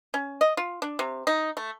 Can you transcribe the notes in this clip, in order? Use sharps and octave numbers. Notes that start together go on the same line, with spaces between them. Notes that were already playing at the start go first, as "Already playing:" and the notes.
C#4
D#5
F4
D4
C3
D#4
A3